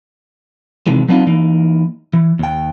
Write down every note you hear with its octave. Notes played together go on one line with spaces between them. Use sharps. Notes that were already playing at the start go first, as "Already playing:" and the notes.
C3 D#3 E3 G#3
F#3 B3 C4 D4 D#4 F4
E3 A#3 D#4
E3
D#2 G5